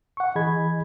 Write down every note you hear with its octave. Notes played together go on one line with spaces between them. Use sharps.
F#5 C#6
E3 G#4 D#5 B5 G#6